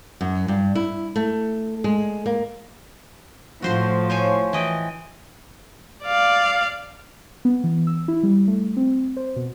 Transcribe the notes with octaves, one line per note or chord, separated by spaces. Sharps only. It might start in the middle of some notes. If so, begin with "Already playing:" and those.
F#2
G2
E4
A3
G#3
A#3
A2 F3 F#4 C5 C6
C5 C#5 G#5
E3 D#5 G5
D5 F5
B3
E3
E6
E4
G3
A3
C4
C5
B2